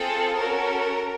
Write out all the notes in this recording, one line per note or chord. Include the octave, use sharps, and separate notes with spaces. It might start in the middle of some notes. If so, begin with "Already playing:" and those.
Already playing: C4 F4 G#4 A4
C#4 F#4 A4 A#4